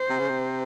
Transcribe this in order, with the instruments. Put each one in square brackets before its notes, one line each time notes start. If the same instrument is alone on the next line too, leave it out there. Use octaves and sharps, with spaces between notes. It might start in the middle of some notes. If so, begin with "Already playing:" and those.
Already playing: [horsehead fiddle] C5
[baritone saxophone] C3
C#3
C3